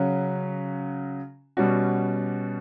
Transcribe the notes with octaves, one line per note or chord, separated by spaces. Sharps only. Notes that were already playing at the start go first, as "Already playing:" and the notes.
Already playing: C#3 F#3 C#4 F#4
B2 G3 C#4 F#4